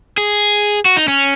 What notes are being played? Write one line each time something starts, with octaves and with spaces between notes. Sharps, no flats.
G#4
F#4
D#4
C#4